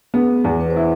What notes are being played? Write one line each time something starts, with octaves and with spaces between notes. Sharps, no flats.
B3 G#4
E2
B4
C5
E4